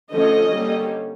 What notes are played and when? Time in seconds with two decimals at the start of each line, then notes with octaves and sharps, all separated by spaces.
0.12 D3 F3 A3 C#4 D#5
0.52 D3 G3 A#3 C#4